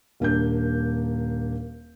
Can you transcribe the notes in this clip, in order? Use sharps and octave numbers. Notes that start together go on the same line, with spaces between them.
D#1 A#3 D4 G6